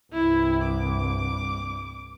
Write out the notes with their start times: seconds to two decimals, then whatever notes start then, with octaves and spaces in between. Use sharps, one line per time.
0.13 C2 G2 E4
0.64 D6